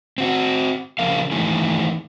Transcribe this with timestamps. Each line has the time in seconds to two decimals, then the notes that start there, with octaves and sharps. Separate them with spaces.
0.18 C4 F#4
0.99 C#3 F3 A#4 F5
1.31 D#3 E3 A3 E4 G#4